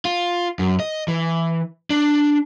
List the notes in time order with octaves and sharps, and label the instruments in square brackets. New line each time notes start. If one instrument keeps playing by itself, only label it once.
[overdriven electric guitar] F4
F#2
D#5
E3
D4